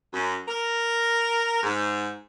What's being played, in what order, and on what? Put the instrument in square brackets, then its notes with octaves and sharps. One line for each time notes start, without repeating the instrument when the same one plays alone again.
[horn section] F#2
A#4
G#2